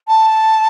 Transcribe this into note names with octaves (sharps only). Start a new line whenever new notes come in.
A5